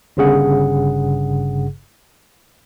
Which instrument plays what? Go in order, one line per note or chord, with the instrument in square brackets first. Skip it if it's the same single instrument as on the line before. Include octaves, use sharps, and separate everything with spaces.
[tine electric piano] G1 G2 C#3 G#4 F#5